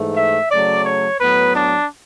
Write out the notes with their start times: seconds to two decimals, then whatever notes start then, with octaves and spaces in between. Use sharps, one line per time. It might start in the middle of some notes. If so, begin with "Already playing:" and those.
Already playing: G#2 E3 A3
0.16 E5
0.50 C#3 F#3 A3 D5
0.85 C#5
1.20 A2 F#3 B3 B4
1.56 D4